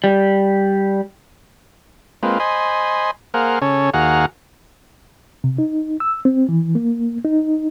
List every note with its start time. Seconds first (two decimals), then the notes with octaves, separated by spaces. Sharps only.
0.04 G3
2.23 G#3 A#3 C4 F4 B4
2.40 C5 D#5 G#5 B5 C6
3.34 A#3 G#4 A#4 C5 F5 F#5
3.62 C#3 C#4 A4 C#5
3.94 D#2 F#4 G#4 F5 F#5 A#5
5.44 C3
5.58 D#4
6.00 E6
6.25 C4
6.49 E3
6.75 A#3
7.25 D#4